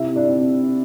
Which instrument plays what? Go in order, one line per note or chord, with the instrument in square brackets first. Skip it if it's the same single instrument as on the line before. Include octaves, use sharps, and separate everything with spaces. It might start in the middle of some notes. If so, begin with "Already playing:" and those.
Already playing: [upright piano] C3 E4 E5
D4 D5
C4